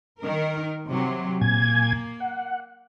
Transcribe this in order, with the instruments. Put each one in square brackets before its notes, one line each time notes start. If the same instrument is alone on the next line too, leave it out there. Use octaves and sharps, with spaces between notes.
[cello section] D#3 A#4
C3 F#3
[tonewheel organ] A#2 G#5 G#6 [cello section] A#3
[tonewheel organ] F#5